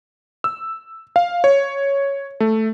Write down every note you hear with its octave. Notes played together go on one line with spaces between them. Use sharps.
E6
F5
C#5
A3